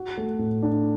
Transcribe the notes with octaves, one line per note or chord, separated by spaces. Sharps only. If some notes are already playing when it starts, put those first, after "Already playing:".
Already playing: F#4
A3
A2
D4